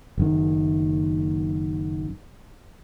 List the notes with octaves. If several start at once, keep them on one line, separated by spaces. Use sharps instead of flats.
F#1 F#2 D#3